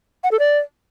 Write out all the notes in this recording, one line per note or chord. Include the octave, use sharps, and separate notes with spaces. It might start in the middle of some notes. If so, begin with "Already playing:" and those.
F#5
A4
D5